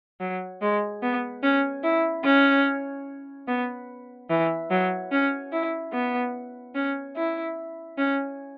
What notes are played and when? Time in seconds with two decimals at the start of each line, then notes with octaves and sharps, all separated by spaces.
0.20 F#3
0.62 G#3
1.02 B3
1.43 C#4
1.83 E4
2.24 C#4
3.47 B3
4.30 E3
4.71 F#3
5.11 C#4
5.52 E4
5.93 B3
6.74 C#4
7.16 E4
7.97 C#4